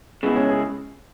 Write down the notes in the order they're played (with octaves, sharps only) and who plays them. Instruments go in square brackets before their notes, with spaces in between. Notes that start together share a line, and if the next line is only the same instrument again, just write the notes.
[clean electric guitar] C#3 G#3 E4 [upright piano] B3
[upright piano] C#4
G#4